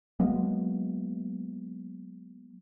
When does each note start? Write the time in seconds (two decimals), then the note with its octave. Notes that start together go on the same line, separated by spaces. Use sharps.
0.20 F#3 G#3 A#3 B3